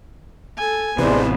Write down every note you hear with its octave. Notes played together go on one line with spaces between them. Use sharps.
A4 G#5
A1 C3 E3 G#3 B3 D4 C5